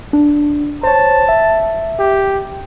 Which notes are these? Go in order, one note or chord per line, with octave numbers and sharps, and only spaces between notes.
D4
C5 C#5 A5
E5
G4